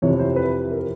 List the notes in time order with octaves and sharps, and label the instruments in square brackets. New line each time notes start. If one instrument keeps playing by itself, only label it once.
[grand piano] F2 C3 E3 C#5
C5
B4
A#4